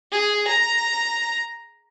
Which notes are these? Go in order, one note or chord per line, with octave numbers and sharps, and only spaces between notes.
G#4
A#5